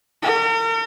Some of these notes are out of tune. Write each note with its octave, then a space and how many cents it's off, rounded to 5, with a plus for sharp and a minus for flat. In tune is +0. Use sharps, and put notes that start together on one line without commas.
A#4 -40